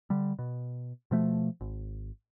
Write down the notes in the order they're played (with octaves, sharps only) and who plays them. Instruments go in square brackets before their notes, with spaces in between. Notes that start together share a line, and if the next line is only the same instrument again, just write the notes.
[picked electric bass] D3 G3
B2
B2 F3 A3
G#1